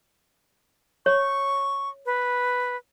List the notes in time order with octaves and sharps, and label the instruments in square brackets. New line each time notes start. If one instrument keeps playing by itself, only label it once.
[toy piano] C#5 [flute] C#6
[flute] B4